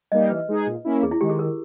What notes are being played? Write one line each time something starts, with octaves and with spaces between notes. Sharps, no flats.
G3 A#3 D#4 G4 D#5
E3 B4
G#3 D#4 G#4
A#2
A#3 C#4 E4
E2 G#4
E4
D#3 G#3 G4
G#4
D#3 A#4